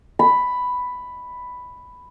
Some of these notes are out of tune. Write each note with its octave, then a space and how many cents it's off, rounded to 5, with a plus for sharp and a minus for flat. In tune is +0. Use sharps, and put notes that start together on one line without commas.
B5 +5